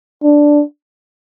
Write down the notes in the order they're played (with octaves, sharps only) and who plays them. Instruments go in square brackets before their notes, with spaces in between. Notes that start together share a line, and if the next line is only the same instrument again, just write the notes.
[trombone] D4